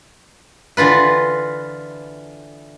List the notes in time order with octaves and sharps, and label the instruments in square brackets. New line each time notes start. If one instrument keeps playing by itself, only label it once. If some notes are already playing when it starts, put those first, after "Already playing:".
[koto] D3 E3 F4 B4